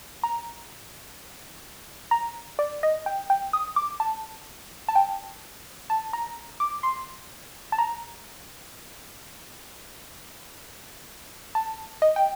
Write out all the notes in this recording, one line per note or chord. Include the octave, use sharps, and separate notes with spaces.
A#5
A#5
D5
D#5
G5
G5
D#6
D6
A5
A5
G5
A5
A#5
D6
C6
A5
A#5
A5
D#5
G5